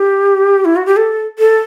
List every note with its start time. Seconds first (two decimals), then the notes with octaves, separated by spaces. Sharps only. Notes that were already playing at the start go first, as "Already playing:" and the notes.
Already playing: G4
0.65 E4
0.76 F#4
0.86 G4
0.97 A4
1.39 A4